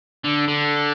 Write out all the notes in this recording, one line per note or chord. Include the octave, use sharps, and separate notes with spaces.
D3
D3